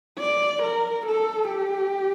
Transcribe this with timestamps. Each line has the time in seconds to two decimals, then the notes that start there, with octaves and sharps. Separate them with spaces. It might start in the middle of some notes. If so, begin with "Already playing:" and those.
0.19 D5
0.63 A#4
1.06 A4
1.49 G4